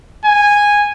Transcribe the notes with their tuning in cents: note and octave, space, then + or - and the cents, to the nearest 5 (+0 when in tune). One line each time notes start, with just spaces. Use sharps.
G#5 -10